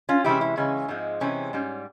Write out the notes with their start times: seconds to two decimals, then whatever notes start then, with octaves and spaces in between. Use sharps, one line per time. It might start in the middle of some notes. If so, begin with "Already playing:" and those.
0.09 C#4 F4
0.24 C3 E3 G#3 C#4 E4 G4
0.41 E4
0.57 C#3 E3 G#3 C#4
0.88 G#2 F3 G#3 C4
1.21 C3 E3 G#3 C4 C#4
1.53 G#2 G3 C#4